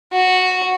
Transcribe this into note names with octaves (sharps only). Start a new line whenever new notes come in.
F#4